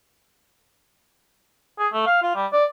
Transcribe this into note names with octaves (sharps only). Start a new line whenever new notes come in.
G#4
A3
F5
F4
G3
D5